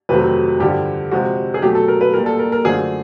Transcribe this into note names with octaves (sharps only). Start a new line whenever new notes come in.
F2 C3 D#3 F#3 A3 B4
G2 D3 F3 G4
C3 F3 G#3 F#4
G#4
B2 F#3 A3 G4
A4
A#4
B4
A#2 G3 A#4
A4
A#4
A#4
F#2 D3 F3 A3 G#4